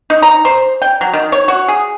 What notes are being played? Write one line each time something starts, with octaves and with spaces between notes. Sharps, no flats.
D#4
A#5
C5
G5
F#3
D#3
C#5
F#4
G#4